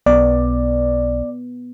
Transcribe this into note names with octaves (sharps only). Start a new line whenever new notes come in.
B1 B3 D5